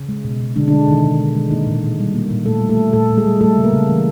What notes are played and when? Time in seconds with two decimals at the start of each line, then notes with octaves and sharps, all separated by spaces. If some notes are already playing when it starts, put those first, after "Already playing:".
Already playing: C#3 C#4
0.09 G#3
0.24 B2
0.40 B2
0.56 D3 G#3 D4
0.68 D3 D4
0.72 G#3
0.87 B2 D#3 D#4
1.03 B2
1.19 G#3
1.35 G#3
1.51 D#3 A#3 D#4
1.67 A#2
1.83 A#2
1.99 G3
2.15 A#3
2.30 A#2
2.46 A#2 A3 A4
2.61 G3
2.69 A3 A4
2.77 A#3
2.93 A#2 A3 A4
3.10 A#2
3.17 G#3 G#4
3.25 G3
3.41 G3 A3 A4
3.57 C#3
3.64 A#3 A#4
3.73 C#3
3.89 E3